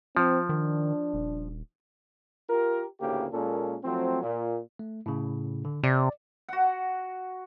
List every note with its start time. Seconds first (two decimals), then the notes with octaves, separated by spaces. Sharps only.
0.17 F3 C4
0.49 D#3 D4
1.14 D#1
2.49 F4 G4 A#4
3.00 D2 A2 C#3 A#3 G4
3.32 A#2 G#3 A#3 C#4 A4
3.83 F3 F#3 A3 C4
4.23 A#2
4.79 A3
5.06 A2 C#3
5.65 D3
5.84 C3 D5
6.49 F#4 F#5